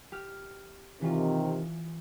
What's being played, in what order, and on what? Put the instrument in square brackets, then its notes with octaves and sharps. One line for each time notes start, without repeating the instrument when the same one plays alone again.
[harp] G4 F6
[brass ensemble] C3 D#3 [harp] E3 C#4 F4